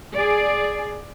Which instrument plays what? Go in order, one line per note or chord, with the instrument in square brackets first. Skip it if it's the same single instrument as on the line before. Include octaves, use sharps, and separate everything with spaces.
[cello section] G#4 D5